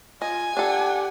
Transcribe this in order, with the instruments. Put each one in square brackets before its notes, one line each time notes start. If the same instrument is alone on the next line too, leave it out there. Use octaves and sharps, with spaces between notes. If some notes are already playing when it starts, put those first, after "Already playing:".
[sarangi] F4 [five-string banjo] D#5 [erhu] G#5
[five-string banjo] D4 A4 [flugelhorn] G4 [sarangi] F#5